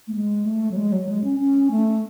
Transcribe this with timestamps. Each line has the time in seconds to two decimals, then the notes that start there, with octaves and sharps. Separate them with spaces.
0.08 A3
0.15 G#3
0.46 A3
0.71 F#3
0.77 G#3
0.92 F#3
1.09 G#3
1.24 C#4
1.40 C#4
1.71 A3